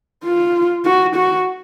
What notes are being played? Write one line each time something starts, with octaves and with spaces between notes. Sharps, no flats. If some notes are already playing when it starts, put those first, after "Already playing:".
F4
F#4
F#4